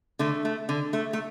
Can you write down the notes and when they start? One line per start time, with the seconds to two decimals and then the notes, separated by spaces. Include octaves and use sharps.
0.19 D3 A3
0.45 A3
0.69 D3
0.93 A3
1.13 A3